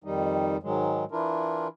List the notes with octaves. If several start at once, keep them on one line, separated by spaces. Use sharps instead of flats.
F2 D#3 G3 D#4
G#2 D#3 F#3 G#3
E3 D4 E4 F4 A#4